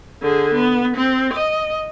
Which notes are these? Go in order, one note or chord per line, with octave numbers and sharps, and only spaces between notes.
D3 G#4
B3
C4
D#5